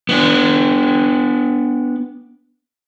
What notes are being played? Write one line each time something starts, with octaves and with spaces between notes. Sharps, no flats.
B3 D4